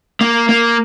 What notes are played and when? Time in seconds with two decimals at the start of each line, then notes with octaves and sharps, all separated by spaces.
0.21 A#3
0.49 A#3